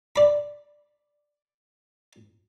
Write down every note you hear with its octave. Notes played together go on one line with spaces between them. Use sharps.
D5 B5